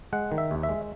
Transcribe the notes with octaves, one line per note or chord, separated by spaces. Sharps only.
G#3 F#5
D#3
E5
D#2
E5
G#3